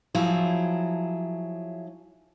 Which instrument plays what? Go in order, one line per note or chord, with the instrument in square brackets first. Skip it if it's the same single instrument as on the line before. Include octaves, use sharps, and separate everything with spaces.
[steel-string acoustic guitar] F3 F#3 E4 G#4